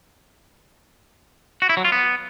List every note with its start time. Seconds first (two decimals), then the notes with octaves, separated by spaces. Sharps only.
1.62 F#4
1.69 E4
1.77 F#3
1.85 F4
1.92 B3